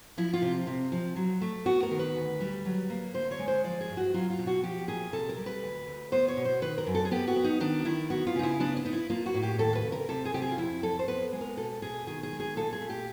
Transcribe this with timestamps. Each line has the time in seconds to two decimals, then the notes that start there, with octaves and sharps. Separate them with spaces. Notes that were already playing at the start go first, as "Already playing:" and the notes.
0.17 F3 E4
0.34 F4
0.42 C3
0.67 C3
0.92 F3
1.16 F#3
1.41 A3
1.66 B3 F#4
1.83 A#4
1.91 D#3
1.99 B4
2.16 D2
2.40 G3
2.65 F#3
2.90 A#3
3.14 D3 C5
3.31 C#5
3.39 G#3
3.48 C5
3.64 F3 D5
3.81 G#4
3.89 G2
3.97 F#4
4.14 F#3 F4
4.30 F4
4.39 B2
4.47 F#4
4.63 F3 G4
4.88 A#2 G#4
5.13 C3 A4
5.29 A#4
5.37 G3
5.46 B4
5.62 D2
5.88 D2
6.12 B3 C5
6.28 C#5
6.37 B2
6.45 C5
6.62 D#3 B4
6.78 A#4
6.87 F#2
6.95 A4
7.05 G#4
7.11 B3 G4
7.28 F#4
7.36 B3
7.44 D#4
7.60 D#3 D4
7.85 D#3 E4
8.10 B3 F#4
8.27 F4
8.35 C#3 D#4
8.43 E4
8.60 B3 D4
8.77 D4
8.85 B3 D#4
8.93 E4
9.10 A#3 F4
9.26 F#4
9.34 A2
9.43 G4
9.59 D#2 A4
9.75 B4
9.84 C#3
9.92 A#4
10.08 C3 A4
10.25 G#4
10.34 C3 G4
10.42 G#4
10.51 F4
10.58 F2 E4
10.83 F2 A4
10.99 C5
11.08 B3 B4
11.33 G#3
11.41 A#4
11.57 B2 A4
11.82 B2 G#4
12.07 D#3 G#4
12.23 G#4
12.32 G#3
12.40 G#4
12.56 A#2 A4
12.73 G#4
12.81 A3
12.90 G4